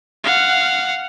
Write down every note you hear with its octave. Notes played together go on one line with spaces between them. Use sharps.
F5 F#5